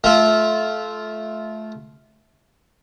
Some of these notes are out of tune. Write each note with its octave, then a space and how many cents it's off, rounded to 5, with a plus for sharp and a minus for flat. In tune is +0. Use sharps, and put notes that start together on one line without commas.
A3 -20 F4 +0